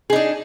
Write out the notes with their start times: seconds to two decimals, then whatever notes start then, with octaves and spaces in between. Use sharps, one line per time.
0.10 G#4
0.13 D#4
0.16 D4